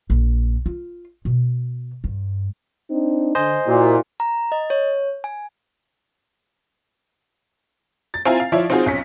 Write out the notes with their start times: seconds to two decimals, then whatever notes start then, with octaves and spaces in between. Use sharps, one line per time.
0.10 A#1
0.66 F4
1.25 B2
2.04 G2
2.90 C4 D4 D#4
3.35 D3 C5 D#5 G#5
3.67 A#2 E4 F#4
4.20 A#5
4.52 D#5
4.70 C#5
5.24 G#5
8.14 A6
8.25 C4 E4 F4 F5 G#5 A#5
8.40 F5
8.52 F3 E4 F4 C#5 D5 E5
8.70 C4 D#4 F4 F#4 G#4 C5
8.86 B1 C#4 B6